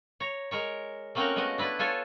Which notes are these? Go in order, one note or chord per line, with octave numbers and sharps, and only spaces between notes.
C#5 A#5
G#3 A#4 C#5
A3 A#3 C4 C#4 F#4 A#4
G#3 A3 B3 F#4 D#5
D4 E4 F4 B4
F4 A4 C#5 G#5